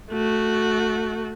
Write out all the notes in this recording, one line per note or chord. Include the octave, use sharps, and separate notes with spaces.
A3 F#4